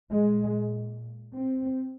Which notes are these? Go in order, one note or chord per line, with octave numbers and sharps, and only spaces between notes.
A#2 G#3
C4